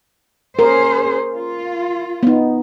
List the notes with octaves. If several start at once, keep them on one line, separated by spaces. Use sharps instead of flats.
C#4 G#4 A#4 C5
F4
B3 D#4